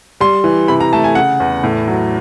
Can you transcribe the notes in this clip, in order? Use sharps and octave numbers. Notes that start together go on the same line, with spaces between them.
G3 C6
E3
C3 B5
A#5
A3 A5
G#5
C#3 F#5
E2
A2
F#3